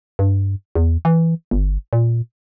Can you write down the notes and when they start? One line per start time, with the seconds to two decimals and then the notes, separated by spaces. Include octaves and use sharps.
0.19 G2
0.75 E2
1.05 E3
1.51 G1
1.93 A#2